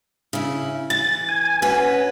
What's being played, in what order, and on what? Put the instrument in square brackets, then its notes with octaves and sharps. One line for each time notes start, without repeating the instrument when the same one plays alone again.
[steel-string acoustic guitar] C#3 E4
[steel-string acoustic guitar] E3 [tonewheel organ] A6
[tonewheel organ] G#5
[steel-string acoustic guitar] C#4 F#4 B4